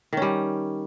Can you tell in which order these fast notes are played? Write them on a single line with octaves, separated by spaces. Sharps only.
D#3 C#4 G3